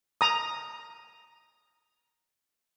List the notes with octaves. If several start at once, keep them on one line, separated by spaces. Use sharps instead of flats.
A#5 D#6